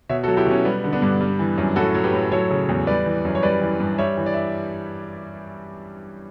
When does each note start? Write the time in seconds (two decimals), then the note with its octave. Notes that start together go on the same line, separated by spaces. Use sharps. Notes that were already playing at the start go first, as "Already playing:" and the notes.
0.09 B2 C#5 E5
0.23 F#4 A4
0.28 F#3
0.37 E4 G4
0.46 B2 C#4
0.65 G3 B3
0.84 D3
0.92 B3 D4
1.02 G2
1.21 G3
1.39 E3
1.58 F#2
1.76 A2 F#4 A4
1.94 F#3
2.04 G4 B4
2.13 A2
2.32 F#3 A4 C#5
2.50 C#3
2.69 E2
2.87 G3 B4 D5
3.06 E3
3.25 F#2
3.35 C#5
3.42 G3 B4 D5
3.61 E3
3.80 G2
3.98 G3 C#5 E5
4.17 E3
4.26 D5
4.34 E5